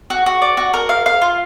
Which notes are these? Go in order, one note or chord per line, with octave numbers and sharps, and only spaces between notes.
F#4
F#4
D5
F#4
A#4
F5
F5
F4